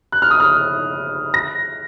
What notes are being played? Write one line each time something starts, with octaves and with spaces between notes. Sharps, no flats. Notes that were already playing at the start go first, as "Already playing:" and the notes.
F#6
F6
D#6
F6
A#6